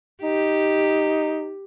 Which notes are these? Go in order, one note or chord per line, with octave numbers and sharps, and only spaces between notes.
D#4 G4